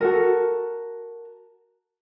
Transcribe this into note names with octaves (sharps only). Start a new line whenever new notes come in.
F#4 A4 A#4